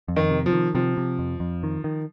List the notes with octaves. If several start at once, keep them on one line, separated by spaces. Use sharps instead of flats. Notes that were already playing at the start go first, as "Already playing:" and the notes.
F2
D#3
C3
F3
D#3
C3 F3
C3
F2
F2
D#3
D#3